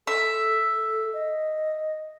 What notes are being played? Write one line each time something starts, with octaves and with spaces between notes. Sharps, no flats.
A4 E5
D#5